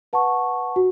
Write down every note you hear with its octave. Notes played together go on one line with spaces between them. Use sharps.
B4 F#5 A5 C#6
F#4